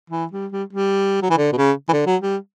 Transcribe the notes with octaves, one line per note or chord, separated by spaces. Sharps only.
E3
G3
G3
G3
F#3
E3
D3
B2
C#3
E3
D3
F#3
G3